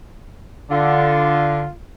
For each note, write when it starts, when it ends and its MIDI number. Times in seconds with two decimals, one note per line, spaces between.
0.71 1.66 50
0.71 1.72 65